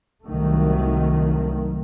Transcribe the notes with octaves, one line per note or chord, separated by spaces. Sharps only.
C2 D#3 F#3 A3